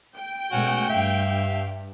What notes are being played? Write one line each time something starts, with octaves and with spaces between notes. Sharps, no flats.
G5
B2 G#3 A3 C#4 F#4
G2 E5 F5